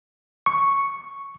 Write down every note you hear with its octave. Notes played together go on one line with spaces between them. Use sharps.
C#6